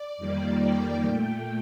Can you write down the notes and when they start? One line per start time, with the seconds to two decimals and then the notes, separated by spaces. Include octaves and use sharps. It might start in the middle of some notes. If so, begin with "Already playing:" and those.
Already playing: D5
0.17 F2 D#3 G3 A#3
0.60 G5
1.03 A#2 A3 G5